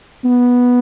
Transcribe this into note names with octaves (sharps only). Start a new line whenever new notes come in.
B3